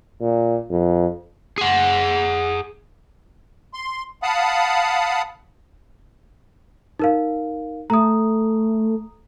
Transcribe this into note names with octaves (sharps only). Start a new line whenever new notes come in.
A#2
F2
G#4 F#5
C6
F5 F#5 A5 B5 D#6
D#4 A#4 F5
A3 A#5 D#6